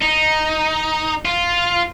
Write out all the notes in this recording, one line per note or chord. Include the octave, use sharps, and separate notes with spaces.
D#4
F4